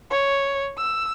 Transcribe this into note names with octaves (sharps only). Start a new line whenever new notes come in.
C#5
E6